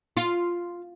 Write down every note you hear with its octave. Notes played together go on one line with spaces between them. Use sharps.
F4